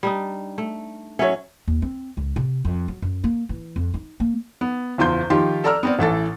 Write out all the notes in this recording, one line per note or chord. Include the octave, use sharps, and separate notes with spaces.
G3 D4 D#4
A3
F#3 C#4 C#5 E5
D#2
C4
C#2
C3
F2
F#3
F#2
A#3
E3
F2
D#4
A#3
B3
F#1 E2 F4 C6 G6
D#3 F3 F4 G4 C6
A4 D5 A#5 E6 F6
B3 C4 D5
A1 E3 A4 A6